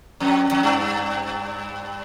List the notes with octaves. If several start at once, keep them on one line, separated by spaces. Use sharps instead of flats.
F2
F2
G2